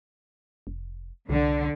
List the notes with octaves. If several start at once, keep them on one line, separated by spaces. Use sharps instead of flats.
F1
C2 D3